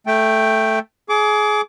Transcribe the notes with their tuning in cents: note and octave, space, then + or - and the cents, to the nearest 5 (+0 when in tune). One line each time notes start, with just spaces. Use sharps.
A3 +0 G5 +0
G#4 +25 D6 -20